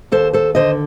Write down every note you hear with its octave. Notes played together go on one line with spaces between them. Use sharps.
D#2 A4 C5
A4 C5
D3 C5 D#5